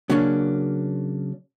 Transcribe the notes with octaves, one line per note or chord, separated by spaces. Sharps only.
C#3 F#3 A#3 C#4 D4